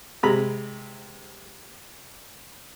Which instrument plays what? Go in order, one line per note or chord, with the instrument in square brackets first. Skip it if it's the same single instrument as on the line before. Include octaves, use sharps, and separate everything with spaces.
[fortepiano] C3 G#3 A#5 B5